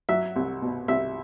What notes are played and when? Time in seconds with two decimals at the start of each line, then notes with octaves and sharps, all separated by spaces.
0.09 F#3 E5
0.36 C2
0.62 B2
0.88 C2 E5